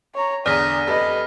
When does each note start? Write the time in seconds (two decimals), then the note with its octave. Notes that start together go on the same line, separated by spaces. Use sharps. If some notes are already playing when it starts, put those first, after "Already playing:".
0.15 C#5 A#5
0.46 E2 D3 D5 A#5 D#6 F6 A#6 B6
0.87 F1 G4 A4 B4 D#5